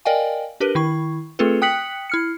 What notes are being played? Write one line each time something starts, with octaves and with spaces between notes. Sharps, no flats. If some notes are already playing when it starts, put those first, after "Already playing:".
A#4 D5 D#5 F5 G5 G#5
D4 G4 A#4 B4
D#3 E4 C#6
A3 C4 F4 G#4 A4 B4
G5 D#6 F#6 B6 C#7 F#7
E4 F6 C#7